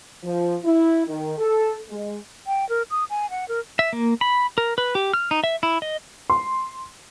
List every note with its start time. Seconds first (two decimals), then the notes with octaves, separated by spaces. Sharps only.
0.24 F3
0.64 E4
1.08 D#3
1.38 A4
1.89 G#3
2.47 G5
2.69 A#4
2.91 D#6
3.10 G#5
3.30 F#5
3.48 A#4
3.79 E5
3.93 A#3
4.21 B5
4.58 A#4
4.78 B4
4.95 G4
5.14 F6
5.31 D#4
5.44 E5
5.63 E4
5.82 D#5
6.30 C6